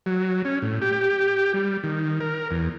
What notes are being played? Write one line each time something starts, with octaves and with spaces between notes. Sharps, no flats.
F#3
C#4
A2
G4
G3
D#3
A#4
E2